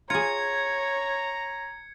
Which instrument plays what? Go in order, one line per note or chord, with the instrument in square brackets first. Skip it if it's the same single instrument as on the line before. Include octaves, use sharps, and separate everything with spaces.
[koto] F4 G#4 [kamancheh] C#5 [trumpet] A#5 [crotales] G#6 C#7